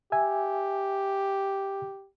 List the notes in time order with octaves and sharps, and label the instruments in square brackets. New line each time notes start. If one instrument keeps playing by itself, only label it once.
[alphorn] G4 [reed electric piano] E5 G#5